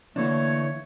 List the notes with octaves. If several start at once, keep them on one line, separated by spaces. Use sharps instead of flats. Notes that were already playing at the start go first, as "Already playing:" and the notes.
D3 E3 A3 A#3 D4 C#5